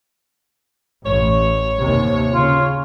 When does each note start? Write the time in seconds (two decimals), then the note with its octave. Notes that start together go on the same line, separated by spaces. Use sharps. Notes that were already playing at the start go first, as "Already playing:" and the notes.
1.06 A1 A2 C#5
1.77 D#2 C3
2.34 C#3 F4